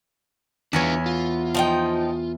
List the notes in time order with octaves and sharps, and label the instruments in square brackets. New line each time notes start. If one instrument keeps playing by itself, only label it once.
[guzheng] E2 B3 C#5 [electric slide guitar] D4 F4 B4
[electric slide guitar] F4
[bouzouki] F3 D#4 G5